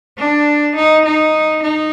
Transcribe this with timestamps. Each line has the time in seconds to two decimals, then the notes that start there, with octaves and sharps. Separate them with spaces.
0.18 D4
0.76 D#4
1.05 D#4
1.63 D#4